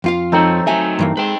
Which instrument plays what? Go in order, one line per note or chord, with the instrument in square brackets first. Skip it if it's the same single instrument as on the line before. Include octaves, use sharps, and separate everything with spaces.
[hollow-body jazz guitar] F2 F4 F5
[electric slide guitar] F3 C#5 [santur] C4 D#4 A4
[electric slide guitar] F#3 A3 [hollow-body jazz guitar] E5 G#5
[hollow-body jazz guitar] G2 E3 A#3
[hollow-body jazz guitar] G#3 [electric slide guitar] B4 G5